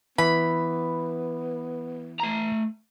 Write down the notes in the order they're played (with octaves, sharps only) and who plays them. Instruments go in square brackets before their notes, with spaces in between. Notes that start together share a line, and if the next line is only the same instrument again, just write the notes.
[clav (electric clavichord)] E3 [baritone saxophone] B3 [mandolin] B5
[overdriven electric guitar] A3 A#5